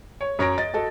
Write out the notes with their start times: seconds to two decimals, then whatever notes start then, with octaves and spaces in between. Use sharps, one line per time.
0.21 C#5
0.39 F#2 C#5 A#5 A#6 D7
0.58 D#5 A6
0.74 F#4 A4 D#5